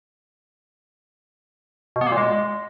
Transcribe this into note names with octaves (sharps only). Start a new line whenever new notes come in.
B2
B3
A#3
A#2
G#3